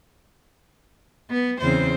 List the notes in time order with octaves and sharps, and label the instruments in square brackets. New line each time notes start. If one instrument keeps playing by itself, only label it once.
[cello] B3
[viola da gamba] E2 C#3 C4 [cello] C5